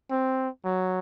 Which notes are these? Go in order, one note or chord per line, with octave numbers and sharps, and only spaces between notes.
C4
F#3